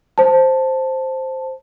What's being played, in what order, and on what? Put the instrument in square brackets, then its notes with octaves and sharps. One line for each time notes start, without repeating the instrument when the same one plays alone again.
[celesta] C5 A5